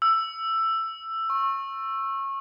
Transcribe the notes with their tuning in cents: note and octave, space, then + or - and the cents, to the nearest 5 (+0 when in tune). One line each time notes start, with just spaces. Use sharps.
E6 +10
C#6 -25